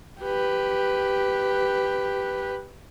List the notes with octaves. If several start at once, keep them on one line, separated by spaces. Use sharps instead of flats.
G4 B4